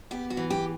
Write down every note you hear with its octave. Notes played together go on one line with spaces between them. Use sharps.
B3 G4
F#4
E3
G4